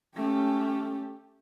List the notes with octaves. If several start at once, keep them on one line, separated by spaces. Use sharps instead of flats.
A3 C#4 G4